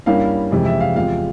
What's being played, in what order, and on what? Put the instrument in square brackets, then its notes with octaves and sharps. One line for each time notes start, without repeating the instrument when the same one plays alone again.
[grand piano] G2 G3 A#3 C#4 E4 F5
F2 C3 E3 G#3
E5
F5
E2 C3 F3 G#3 F5